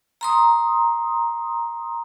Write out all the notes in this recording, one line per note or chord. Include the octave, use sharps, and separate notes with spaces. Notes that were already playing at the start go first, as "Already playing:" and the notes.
A#5 C6 D#6